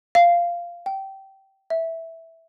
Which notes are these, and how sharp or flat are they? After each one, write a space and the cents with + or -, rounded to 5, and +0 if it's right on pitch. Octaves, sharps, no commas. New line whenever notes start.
F5 -10
G5 -20
E5 -5